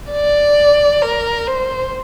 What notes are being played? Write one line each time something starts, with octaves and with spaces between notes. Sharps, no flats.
D5
A#4
C5